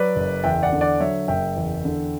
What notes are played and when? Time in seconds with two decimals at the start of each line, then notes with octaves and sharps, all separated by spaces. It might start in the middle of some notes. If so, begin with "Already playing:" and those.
Already playing: F#3 B4 D5
0.16 F#1
0.44 E2 E5 G5
0.62 D5 F#5
0.73 D3
0.81 D5 F#5
1.00 F#3 C#5 E5
1.28 F#1 E5 G5
1.56 E2
1.85 D3